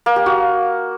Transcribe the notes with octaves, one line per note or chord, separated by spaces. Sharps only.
A#3
G4
F#4